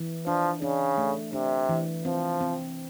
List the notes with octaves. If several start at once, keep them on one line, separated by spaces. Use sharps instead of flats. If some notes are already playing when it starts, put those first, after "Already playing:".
Already playing: E3
F3 D4
C#3 D4
A3
C3 D4
E3
F3 C4
C4